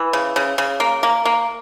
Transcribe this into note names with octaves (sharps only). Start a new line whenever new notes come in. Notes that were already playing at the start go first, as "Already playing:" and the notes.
Already playing: E3
C#3
C#3
C#3
A#3
A#3
A#3